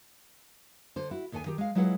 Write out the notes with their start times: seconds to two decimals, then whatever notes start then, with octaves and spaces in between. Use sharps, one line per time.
0.96 D3 C5
1.11 E4 F#4
1.32 D#2 D#3 A4 C5 G#5
1.46 D#3 G4
1.58 G#3 F5
1.75 F#3 G#3 E4 F4 B4 F#5